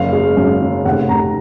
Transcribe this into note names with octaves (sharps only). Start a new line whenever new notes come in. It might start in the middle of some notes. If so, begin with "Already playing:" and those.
Already playing: F#1 F5
G#3
F#2
C#3
F1 F#5
F1 A#5